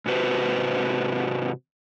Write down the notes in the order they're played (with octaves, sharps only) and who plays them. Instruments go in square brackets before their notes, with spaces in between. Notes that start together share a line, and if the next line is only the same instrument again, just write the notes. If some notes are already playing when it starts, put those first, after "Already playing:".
[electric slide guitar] G#2 C3 F#4 B4 C5